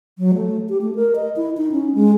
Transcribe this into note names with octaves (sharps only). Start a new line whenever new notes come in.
F#3
A3
G4
A3
A#4
D#5
E4
D#4
C#4
G#3